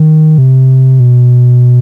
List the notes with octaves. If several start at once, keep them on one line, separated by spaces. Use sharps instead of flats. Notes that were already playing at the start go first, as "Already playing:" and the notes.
Already playing: D#3
C3
B2